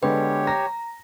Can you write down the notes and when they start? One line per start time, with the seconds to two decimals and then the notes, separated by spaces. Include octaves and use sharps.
0.03 D3 G#3 B3 G4 B4 C#5
0.47 A#5 A#6